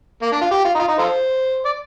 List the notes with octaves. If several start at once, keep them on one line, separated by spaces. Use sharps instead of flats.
A#3
D4
F4
G4
F4
D#4
F4
D#4
F4 A4 C5
D5